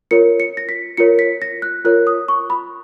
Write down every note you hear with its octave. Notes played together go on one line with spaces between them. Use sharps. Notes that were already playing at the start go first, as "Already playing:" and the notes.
F4 A#4 C#5 C#7
C#7
A#6
B6
F4 A#4 C#5 C#7
B6
A#6
F#6
F4 A#4 C#5 F#6
D#6
C#6
B5